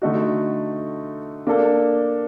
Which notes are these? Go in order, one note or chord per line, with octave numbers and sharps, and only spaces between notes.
D3 A3 D#4 F#4
A#3 D4 A4